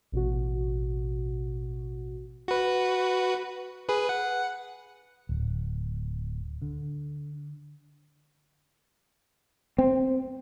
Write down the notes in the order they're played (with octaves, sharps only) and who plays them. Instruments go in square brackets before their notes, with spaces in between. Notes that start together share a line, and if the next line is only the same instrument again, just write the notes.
[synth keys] A1 B2 F#4
[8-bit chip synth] F#4 B4
G#4 B4
F#5
[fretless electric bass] D1
D3
C4